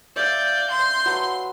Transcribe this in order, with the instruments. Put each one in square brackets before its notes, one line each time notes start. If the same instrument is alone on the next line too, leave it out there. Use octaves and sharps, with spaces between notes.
[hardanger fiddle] D5 [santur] E5 F5 [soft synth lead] G6
[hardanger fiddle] C6
[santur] F#3 A4 B4